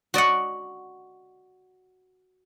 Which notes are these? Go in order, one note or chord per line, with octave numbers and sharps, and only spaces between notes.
F#4 D5 D#5 F#5